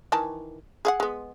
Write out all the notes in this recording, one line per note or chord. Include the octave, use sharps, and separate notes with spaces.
D#3 E3 A5
G#4 F5 F#5
G#3 B3